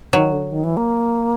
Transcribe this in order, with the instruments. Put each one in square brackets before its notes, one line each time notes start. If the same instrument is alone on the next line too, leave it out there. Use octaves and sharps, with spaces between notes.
[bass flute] D#3 [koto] F#3
[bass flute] D3
D#3
E3
A#3